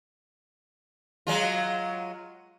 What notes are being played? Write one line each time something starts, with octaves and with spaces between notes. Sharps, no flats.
F#3 G#3 F4